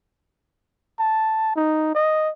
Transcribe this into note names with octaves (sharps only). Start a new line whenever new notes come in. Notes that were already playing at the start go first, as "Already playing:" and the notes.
A5
D#4
D#5